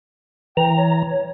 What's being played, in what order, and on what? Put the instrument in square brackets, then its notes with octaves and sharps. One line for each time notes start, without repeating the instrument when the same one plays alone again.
[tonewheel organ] E3 A#5 [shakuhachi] G5
[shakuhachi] C#5